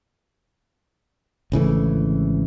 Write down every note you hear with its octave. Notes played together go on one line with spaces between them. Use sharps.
G#1 C#3 E3 A3